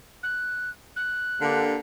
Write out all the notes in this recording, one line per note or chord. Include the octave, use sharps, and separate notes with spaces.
F#6
F#6
D3 A#3 G4